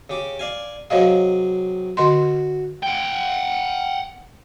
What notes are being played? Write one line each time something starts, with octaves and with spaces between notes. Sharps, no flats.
C#3 G4 D6
D5 F5 G#5
C3 F#3 G#4 C#5 D#5 F5
D3 F#4 D#5 C6
F#5 G5